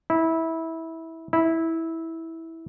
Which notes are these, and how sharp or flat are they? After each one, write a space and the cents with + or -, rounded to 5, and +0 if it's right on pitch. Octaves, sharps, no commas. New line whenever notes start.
E4 -20
E4 -15